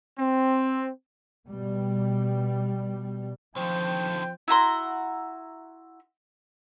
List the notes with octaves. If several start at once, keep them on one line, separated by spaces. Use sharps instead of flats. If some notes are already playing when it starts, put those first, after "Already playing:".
C4
B2 G3
D3 D#3 F3 C4 G5
E4 F#4 A#5 C6